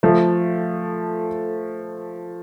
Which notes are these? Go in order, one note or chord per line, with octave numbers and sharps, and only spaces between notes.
F3 A3